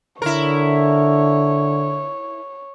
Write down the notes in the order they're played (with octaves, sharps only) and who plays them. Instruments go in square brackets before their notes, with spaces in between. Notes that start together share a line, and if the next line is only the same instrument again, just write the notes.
[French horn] D3 [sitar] E4 A#4 [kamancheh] C#5